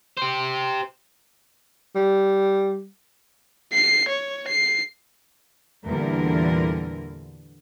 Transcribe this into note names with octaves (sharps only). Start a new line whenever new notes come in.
G4 C5
G3
C7
C#5
C7
E2 A#2 D3 E3 G3 A#4